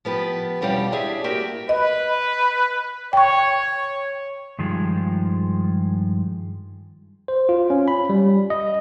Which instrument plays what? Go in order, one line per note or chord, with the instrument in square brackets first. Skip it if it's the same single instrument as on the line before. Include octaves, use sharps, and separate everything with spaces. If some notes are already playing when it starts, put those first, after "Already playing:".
[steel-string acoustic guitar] F3 B3 G4 B4
E2 B2 G3 C#4 G4 F5
D4 E4 G4 G#4 E5
A#3 F#4 G4 E5 G5
[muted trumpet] B4 [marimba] D#5
[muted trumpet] C#5 [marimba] G5 C#6
[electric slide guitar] G2 D#3 F3 G#3
[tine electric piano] C5
F4
C#4
B5
G3
D#5